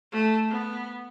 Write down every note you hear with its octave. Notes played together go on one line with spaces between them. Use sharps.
A3
B3